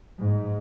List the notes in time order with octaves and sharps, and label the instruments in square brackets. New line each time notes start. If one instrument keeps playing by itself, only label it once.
[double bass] G#2